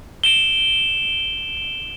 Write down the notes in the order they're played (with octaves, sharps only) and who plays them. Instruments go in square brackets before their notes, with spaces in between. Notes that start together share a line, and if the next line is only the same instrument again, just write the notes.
[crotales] D7 E7 G7